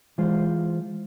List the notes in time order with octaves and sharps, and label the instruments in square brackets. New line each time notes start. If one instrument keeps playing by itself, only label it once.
[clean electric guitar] E3 G#3 F4 C5